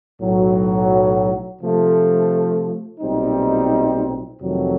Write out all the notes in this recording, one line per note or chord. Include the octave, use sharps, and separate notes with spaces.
B1 A2 F#3
C3 F3 A3
B1 A#2 G3 C4 D#4
F2 C3 D#3 F#3 A3